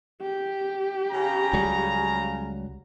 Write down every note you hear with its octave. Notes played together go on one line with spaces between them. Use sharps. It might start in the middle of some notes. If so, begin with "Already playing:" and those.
G4
C#3 A#5
C#2 F#3 G3